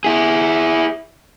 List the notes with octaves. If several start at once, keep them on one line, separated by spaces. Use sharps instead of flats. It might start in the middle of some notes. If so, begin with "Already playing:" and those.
E4 G#4